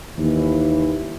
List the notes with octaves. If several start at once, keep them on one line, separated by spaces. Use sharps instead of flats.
D#2 E3